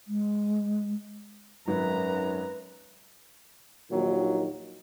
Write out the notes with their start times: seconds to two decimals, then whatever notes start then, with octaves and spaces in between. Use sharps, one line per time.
0.07 G#3
1.68 G#1 F#2 F#3 B4 A#5
3.90 A#1 D#2 A#2 D#3 F#3